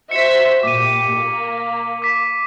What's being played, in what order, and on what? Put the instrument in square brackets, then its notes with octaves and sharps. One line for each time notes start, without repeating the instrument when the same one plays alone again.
[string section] F#4 C5 E5 [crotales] B6 C#7
[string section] A#2 G4 [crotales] D6 D#7
[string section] A#3
[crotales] D6 B6